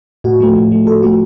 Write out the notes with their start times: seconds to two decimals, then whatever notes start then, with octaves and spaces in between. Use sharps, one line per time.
0.24 A2 F#4
0.40 F3 A3
0.56 A2
0.71 F3 A3
0.87 A2 A4
1.02 F3 A3 F#4